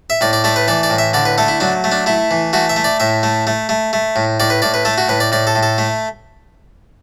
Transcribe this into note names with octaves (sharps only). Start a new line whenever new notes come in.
E5
A2 D5
D5
A3 D5
B4
E3 D5
D5
A2
E5
D3 D5
B4
A3 A4
E4
F#3 D4
A3
D4
A3 E4
E3
A3 F#4
E5
A3
D5
A2 E5
A3
A3
A3
A3
A2
A2 D5
B4
A2 D5
B4
A3 A4
F#4
A2 B4
D5
A2 D5
A4
A2
A4
A3